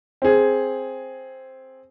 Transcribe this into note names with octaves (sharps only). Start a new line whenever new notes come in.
C4 G#4